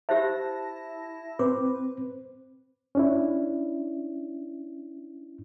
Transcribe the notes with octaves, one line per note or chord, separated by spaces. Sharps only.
E4 G4 C5 E5 A5 A#6
C4 B4 C5 D6
C#4 D4 E4